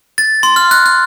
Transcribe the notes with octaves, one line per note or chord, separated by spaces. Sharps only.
A6
C6
F6
F#6
F#6